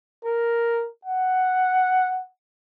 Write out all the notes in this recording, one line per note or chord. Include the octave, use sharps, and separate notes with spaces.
A#4
F#5